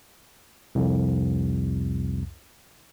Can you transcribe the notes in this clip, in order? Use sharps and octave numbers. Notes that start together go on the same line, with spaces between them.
C2 F2